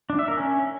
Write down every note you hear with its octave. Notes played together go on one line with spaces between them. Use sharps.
D4
E5
A#4
C#4